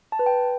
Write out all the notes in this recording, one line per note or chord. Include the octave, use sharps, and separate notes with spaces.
A5
B4
G5